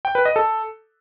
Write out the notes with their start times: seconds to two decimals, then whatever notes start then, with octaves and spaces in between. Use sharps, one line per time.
0.05 G5
0.15 B4
0.25 D#5
0.36 A4